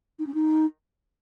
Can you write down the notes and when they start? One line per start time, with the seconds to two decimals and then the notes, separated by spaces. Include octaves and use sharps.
0.19 D#4
0.26 C#4
0.34 D#4